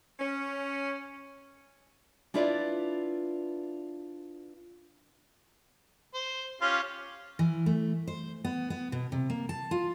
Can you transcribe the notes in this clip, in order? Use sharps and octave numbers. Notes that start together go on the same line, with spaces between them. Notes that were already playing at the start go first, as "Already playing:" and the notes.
C#4
D4 E4 F4 B4 D5
C5
C#4 F4 G4
E3
A3
C5
B3
B3
B2
C3
A#3
A5
F4